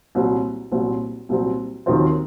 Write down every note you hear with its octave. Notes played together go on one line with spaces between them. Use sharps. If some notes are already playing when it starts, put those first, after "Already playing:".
C2 A#2 F#3 C4
C2 A#2 F#3 C4
C2 A#2 F#3 C4
D#2 D#3 F#3 C4 F4